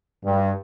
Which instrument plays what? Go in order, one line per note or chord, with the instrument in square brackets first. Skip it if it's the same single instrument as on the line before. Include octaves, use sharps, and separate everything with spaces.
[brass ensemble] G2